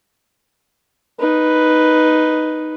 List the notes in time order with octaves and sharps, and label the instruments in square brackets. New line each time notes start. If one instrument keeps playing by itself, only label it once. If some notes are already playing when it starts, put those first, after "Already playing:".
[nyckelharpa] D#4 B4